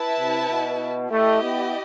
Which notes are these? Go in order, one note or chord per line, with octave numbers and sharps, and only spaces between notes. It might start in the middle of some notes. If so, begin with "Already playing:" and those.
Already playing: E4 B4 E5 A5
C3
B2
A3 E4 G4 D#5
B3